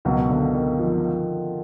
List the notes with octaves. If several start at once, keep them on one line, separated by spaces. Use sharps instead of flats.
C#2 B2 D#3 F#3
D3
D#3
F3